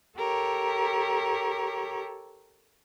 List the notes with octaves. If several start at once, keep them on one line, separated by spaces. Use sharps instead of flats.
G4 A4 A#4 C#5